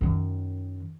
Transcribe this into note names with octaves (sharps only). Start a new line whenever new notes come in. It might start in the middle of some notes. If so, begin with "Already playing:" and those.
F#2 D#3